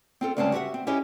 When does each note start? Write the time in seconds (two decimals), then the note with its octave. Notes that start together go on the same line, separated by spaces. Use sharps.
0.21 C4 F4 A4
0.37 D2 G2 C#3 G#3 C4 A5
0.52 F#4 G4 A#4 E5 F#5
0.74 C4
0.87 C#4 E4 G4 G#4 C#5 D#5